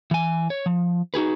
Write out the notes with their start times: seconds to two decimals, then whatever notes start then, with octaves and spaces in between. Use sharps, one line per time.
0.11 E3 G#5
0.50 C#5
0.66 F3
1.14 D#4 F#4 G#4 B4